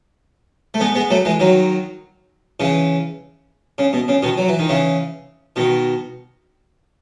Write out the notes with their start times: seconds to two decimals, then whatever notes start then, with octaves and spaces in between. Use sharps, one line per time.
0.74 A3
0.80 G#3 B3
0.95 G#3 B3
1.10 F#3 A3
1.25 E3 G#3
1.40 D#3 F#3
2.60 C#3 E3
3.78 C#3
3.93 B2
4.08 C#3
4.23 B2 D#3
4.38 F#3
4.48 E3
4.59 D#3
4.69 C#3 E3
5.56 B2 D#3